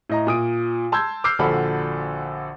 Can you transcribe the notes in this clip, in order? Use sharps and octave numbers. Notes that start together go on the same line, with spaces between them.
A2 D#5 A#5
A#2 D#6 D7
A5 C6 E6 G6 G#6
D6 E6 F6 G6 C7
A#1 D3 F#4 A4 D5 B5